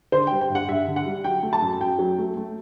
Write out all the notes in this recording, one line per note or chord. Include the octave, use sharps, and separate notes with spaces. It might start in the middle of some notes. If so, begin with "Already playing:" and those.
D3 C5
G3 G5
G5
G2
F#5
G2 E5
D3
F#5
G3
F#3 G5
A3
A5
F#2
F#2 G5
F#3
A3
A3